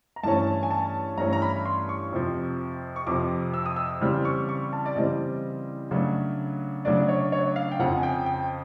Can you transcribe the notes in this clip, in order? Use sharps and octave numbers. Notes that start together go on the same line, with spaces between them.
A#5
G2 E3 A3 C#4 A5
G#5
A5
G2 E3 A3 C#4 A#5
A#5
B5
C6
C#6
F2 C3 F3
C#6
F2 C3 F3 D6
E6
D#6
E6
C#3 E3 G3 C4 F6
C#6
C#6
A5
D5
C#3 E3 G3 C4 D#5
C#3 F#3 A3 D4
C#3 F#3 A3 D4 D5
C#5
C#5
F5
G5
F2 C#3 F3 F#5
G#5
G5
G5